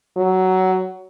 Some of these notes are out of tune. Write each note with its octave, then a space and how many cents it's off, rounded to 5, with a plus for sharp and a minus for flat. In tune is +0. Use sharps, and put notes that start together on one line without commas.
F#3 +15